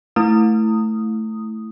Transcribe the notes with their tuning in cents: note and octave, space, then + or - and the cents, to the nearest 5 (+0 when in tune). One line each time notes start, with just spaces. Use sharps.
A3 +0 E4 +0 D#6 +0